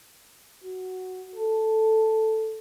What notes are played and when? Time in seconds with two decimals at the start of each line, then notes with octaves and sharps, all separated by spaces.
0.64 F#4
1.36 A4